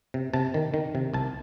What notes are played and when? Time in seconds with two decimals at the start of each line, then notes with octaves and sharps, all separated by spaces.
0.14 C3
0.34 C3 A5
0.54 D#3
0.74 D#3
0.95 C3
1.14 C2 A5